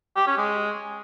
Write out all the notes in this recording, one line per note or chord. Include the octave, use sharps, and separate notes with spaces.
G4
C#4
G#3